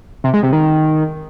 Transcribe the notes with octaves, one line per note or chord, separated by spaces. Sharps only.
C3
G#3
C3
D#3